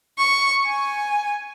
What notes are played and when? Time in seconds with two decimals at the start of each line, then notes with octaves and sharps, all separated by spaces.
0.18 C#6
0.65 G#5